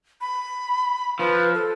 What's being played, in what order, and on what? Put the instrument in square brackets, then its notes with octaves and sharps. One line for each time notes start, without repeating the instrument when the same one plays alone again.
[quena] B5
[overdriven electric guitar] F3 [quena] B4
[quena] A4